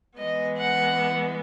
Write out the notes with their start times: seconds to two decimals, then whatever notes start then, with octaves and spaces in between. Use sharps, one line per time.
0.19 E3 G#3 B3 D#5
0.57 F#5